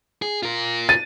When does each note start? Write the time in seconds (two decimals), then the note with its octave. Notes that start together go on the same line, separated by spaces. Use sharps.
0.22 G#4
0.43 F4 A#4
0.89 A6 D#7